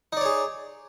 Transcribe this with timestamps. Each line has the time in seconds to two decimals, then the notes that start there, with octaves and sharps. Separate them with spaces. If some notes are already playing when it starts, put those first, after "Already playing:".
0.13 D#4
0.17 D5
0.21 C#5
0.25 G#4